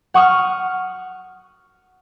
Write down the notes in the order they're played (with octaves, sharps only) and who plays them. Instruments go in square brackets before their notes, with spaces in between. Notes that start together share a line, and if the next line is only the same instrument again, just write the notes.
[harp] F#5 C#6 D#6 F6